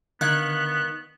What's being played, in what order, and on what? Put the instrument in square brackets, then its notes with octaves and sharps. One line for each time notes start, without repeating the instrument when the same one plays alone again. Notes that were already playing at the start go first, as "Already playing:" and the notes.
[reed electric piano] D3 F5 G#6 [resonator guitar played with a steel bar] D#3 [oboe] B3 [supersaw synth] F#6